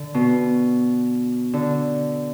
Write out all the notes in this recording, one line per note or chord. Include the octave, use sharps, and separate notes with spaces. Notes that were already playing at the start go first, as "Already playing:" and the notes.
Already playing: D3
B2
D3